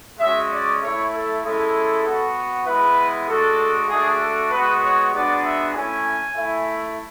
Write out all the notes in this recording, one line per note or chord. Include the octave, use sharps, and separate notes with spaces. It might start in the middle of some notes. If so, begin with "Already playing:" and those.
G#3 C#4 F#4 E5
D5
A3 E4 C#5
A4
G#3 C#4 E4 A4
B3 F#4
G#3 B3 E4 B4
G#3 D4 F#4 A4
A3 D4 F#4 G#4
A4
G#3 B3 F#4 B4
C#5
G#3 B3 D4 F#4 D5
E5
A3 C#4 E4 G#5
A3 E4